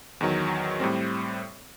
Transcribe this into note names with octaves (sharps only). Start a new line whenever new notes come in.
E2 D#3 F#3
A2 G3 C4